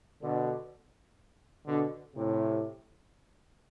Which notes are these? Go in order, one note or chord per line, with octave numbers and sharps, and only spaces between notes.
B2 D3
B2 D3
A2 C3